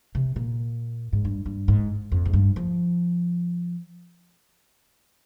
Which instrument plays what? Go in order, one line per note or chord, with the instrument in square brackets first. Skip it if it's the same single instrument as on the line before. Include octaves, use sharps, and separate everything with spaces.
[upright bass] C3
A#2
G#2
G2
G2
G#2
F2
G#2
G2
F3